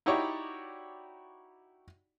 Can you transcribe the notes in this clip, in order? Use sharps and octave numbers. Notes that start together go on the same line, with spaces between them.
D#4 E4 F#4 G4 C#5 D5